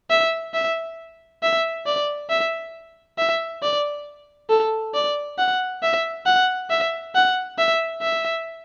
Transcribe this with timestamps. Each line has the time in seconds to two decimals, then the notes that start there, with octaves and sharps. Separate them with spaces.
0.10 E5
0.54 E5
1.43 E5
1.86 D5
2.30 E5
3.18 E5
3.63 D5
4.50 A4
4.94 D5
5.38 F#5
5.83 E5
6.26 F#5
6.70 E5
7.15 F#5
7.58 E5
8.02 E5